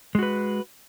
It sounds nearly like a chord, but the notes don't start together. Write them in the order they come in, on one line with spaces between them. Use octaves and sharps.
G#3 F#4 B4